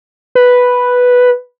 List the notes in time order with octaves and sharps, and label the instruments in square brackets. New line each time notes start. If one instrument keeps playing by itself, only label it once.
[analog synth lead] B4